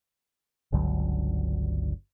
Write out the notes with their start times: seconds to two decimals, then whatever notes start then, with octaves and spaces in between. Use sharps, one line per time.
0.72 G1 C#2 D3 F#3